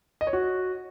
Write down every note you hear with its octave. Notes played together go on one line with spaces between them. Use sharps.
D#5
C#5
F#4